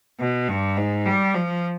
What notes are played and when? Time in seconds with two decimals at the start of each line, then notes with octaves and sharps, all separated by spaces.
0.20 B2
0.48 G2
0.77 G#2
1.06 G3
1.34 F3